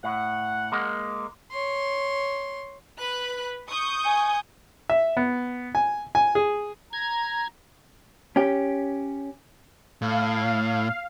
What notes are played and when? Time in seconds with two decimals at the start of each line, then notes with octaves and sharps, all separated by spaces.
0.04 A2 F#5
0.72 G#3 A#3
1.52 C#5 C6
2.99 B4 B5 F#6
3.69 C#6 D#6 G6
4.06 G#5
4.90 E5
5.17 B3
5.75 G#5
6.15 G#5
6.35 G#4
6.93 A#5 G#6
8.36 C#4 G4
10.02 A2 F5